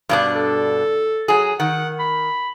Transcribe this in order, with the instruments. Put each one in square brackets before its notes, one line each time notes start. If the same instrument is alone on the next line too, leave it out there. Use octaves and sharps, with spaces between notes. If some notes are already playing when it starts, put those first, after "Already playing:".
[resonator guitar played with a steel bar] G2 B2 D4
[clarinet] A4
[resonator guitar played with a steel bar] F#3 G#4
[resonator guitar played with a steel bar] D#3 [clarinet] F#5
[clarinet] B5